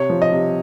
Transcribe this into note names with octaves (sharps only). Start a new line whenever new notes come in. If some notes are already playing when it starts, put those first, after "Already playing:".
Already playing: C3 C#5
F3
D#5
C3